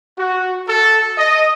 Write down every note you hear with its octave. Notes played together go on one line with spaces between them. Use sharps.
F#4
A4
D#5